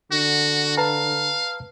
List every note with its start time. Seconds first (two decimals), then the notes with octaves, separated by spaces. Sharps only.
0.12 D3 F#4
0.77 B4 F5 A5 A#5